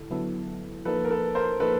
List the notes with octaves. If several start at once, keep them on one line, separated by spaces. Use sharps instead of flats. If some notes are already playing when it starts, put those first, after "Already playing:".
Already playing: D3 E4 A4
D3 F#3 B3 E4 A4
F3 A#3 D#4 A4 B4
A#4
A4 B4
A#4 C5
F3 A#3 D#4 A4 B4